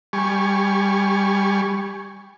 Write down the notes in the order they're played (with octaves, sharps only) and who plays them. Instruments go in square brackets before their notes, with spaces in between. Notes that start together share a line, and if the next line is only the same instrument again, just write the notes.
[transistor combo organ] G3 G#5 C#6